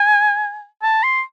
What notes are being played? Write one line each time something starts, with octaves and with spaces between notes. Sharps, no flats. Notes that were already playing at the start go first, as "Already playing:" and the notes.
Already playing: G#5
A5
C6